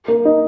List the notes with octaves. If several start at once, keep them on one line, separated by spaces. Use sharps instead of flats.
A#3
D#4